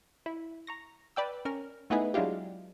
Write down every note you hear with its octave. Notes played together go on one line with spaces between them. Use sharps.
E4
A#5 C#6 A#6
B4 D5 G5 E6
C#4 A#4 F6
A3 B3 D#4 E4 G#4 B4
F#3 G#3 D4 E4 F4 G4